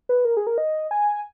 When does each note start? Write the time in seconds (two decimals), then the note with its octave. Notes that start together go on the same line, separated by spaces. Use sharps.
0.09 B4
0.25 A#4
0.37 G#4
0.47 A#4
0.58 D#5
0.91 G#5